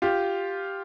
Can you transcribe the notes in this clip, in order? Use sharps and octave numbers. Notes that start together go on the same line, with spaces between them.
F4 G4